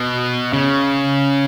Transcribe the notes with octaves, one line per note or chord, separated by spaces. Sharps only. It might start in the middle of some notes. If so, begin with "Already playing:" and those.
Already playing: B2
C#3